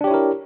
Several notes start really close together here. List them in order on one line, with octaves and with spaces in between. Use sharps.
D4 G4 C#5 E4 A#4